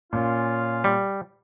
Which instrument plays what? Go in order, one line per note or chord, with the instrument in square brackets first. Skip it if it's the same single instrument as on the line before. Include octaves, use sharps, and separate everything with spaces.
[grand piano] A#2 [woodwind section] C#4 F4
[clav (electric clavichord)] G3